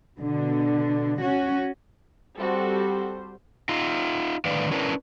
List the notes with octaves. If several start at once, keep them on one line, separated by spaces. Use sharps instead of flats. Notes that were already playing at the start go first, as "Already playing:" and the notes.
B2 D3
C#4 F#4
G3 C4 F#4 A4 C5
D#4 F4
A2 D3 D#3 B4 D5 F5
C#4 D4 E4 A#4 B4